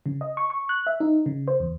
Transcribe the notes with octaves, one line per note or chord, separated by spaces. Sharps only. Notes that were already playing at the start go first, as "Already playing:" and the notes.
C#3
D#5
C#6
C#6
F#6
E5
D#4
C#3
C5
E2